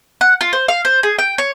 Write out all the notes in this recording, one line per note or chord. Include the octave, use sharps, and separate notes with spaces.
F#5
F4
C5
F5
C5
G#4
G5
C#5